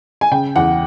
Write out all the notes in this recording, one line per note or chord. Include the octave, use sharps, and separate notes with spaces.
G#5
C#3 G5
E2 F#5